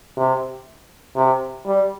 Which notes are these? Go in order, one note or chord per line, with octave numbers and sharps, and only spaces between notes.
C3
C3
G3